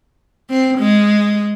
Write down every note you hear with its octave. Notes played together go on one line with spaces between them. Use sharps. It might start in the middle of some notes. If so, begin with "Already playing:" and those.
C4
G#3